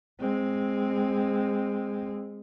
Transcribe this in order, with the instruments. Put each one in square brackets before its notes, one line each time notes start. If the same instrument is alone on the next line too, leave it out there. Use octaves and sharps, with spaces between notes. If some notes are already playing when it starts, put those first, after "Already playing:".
[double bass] G#3 C4